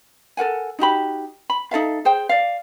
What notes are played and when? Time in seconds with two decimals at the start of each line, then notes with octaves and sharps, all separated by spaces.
0.37 A4 A#4 F#5 G#5
0.79 D#4 F#4 G4 B5
1.50 B5
1.71 D#4 A4 E5 F5
2.05 G#4 C5 G5
2.29 D5 F5